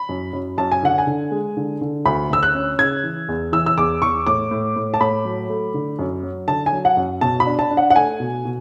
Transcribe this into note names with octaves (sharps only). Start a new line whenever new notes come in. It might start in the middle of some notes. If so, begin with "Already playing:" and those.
Already playing: B5
F#2
F#2
F#2 A5
G#5
D3 F#5
G#5
D3
G#3
D3
D3
D2 B5
D2 E6
F#6
C#4
C#3 G#6
E3
E2
E3 E6
E6
E2 D6
E2 C#6
A2 D6
A2
A2
A5
A2 B5
F#3
A3
D3
F#2
F#3
D3 A5
G#5
F#3
F#5
F#2
B2 A5
B5
D4
A5
D4
F#5
F#5
A3 G#5
B2
B2